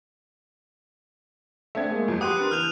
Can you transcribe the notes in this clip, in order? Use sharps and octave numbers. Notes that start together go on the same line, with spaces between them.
A3 C4 D4 E5 G#6
G#3 A#3 G#4
G1 F2 F#3
G4 B4 F#5 C6 D#6 F#6 D#7
B3 D4 A#4
F#1 E3 F6 G6 E7 F7